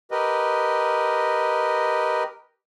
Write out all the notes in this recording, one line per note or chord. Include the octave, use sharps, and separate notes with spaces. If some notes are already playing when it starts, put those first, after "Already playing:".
G4 A#4 B4 D#5